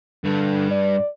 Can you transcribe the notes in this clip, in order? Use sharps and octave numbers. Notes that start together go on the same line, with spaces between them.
G2 D3
D5